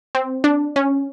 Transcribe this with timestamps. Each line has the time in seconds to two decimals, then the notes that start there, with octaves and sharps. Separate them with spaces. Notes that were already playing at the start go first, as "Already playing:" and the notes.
0.15 C4
0.44 D4
0.76 C#4